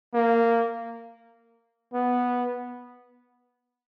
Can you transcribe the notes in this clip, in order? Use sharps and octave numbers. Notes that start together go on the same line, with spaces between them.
A#3
B3